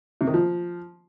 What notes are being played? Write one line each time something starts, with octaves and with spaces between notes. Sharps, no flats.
C3
D#3
F3